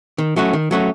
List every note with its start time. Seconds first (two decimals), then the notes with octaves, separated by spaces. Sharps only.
0.18 D#3
0.36 F#3 A3 C#4 F#4
0.53 D#3
0.71 F#3 A3 C#4 F#4